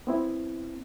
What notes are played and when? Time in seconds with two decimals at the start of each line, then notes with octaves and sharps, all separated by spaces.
0.07 B3 C4 E4